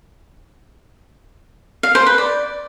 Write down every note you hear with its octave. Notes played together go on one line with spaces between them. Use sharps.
F5
C5
B4
D5